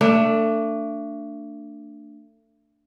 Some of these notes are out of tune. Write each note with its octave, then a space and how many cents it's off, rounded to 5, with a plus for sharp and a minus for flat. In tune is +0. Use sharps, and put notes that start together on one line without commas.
A3 +30 D4 +0